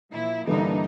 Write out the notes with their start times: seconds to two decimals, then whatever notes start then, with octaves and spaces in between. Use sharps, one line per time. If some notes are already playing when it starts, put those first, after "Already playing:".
0.11 A#2 F3 E4
0.47 G2 D3 E3 A#3 D4 D#4